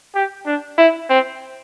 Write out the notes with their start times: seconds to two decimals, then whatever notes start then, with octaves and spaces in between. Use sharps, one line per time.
0.15 G4
0.46 D4
0.78 E4
1.10 C4